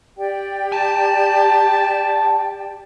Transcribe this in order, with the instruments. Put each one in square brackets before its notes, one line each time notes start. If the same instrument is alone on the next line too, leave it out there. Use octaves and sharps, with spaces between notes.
[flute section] G4 D5 G5
[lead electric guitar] G#5 A5